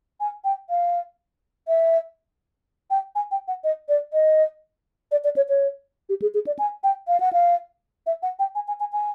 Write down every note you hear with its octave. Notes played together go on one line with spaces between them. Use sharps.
G#5
G5
F5
E5
G5
G#5
G5
F#5
D#5
D5
D#5
D5
D5
C#5
C#5
G4
G#4
G#4
D5
G#5
G5
F5
F#5
F5
E5
F#5
G5
G#5
G#5
G#5
G#5